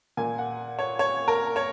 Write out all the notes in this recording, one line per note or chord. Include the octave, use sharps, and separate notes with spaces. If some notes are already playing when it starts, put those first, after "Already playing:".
A#2 A#3 G#5
F#5
C#5
C#5
A#4
C#5